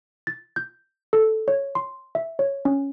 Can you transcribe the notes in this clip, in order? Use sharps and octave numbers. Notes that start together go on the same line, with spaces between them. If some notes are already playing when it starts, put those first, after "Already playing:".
A6
G6
A4
C#5
C6
E5
C#5
C#4